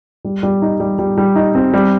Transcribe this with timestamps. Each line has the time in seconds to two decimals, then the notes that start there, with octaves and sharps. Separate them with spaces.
0.25 G3
0.43 G3
0.62 D#4
0.80 G3
0.99 G3
1.18 G3
1.36 D#4
1.55 C4
1.74 G3